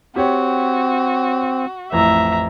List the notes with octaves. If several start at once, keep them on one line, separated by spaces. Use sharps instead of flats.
C4 F#4 G4 C#5
A1 F2 E3 E5 A#5